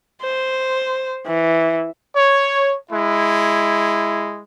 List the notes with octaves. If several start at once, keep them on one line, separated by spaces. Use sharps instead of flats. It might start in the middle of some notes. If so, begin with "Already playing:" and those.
C5
E3
C#5
G#3 E4